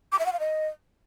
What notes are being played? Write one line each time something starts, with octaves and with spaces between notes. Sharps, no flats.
D6
E5
F#5
F5
D#5